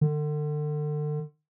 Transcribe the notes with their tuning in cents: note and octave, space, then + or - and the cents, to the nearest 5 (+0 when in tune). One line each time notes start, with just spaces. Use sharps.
D3 +35